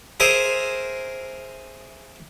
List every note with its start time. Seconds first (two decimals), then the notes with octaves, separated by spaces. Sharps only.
0.20 G#4 A#4 C5 E5